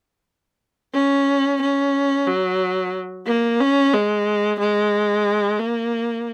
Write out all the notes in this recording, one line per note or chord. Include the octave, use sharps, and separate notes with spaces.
C#4
C#4
F#3
A#3
C#4
G#3
G#3
A#3